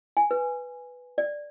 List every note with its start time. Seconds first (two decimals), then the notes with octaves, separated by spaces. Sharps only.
0.17 G#5
0.31 B4
1.18 D5